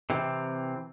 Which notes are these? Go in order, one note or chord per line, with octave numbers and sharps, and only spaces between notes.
C3 E3 C4